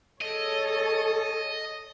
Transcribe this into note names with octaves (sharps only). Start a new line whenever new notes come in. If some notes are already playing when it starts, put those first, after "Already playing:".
G#4 A4 C#5 D#5